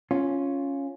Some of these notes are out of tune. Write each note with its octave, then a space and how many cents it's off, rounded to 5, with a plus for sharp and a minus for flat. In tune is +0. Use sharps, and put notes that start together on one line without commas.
C#4 +0 F4 +0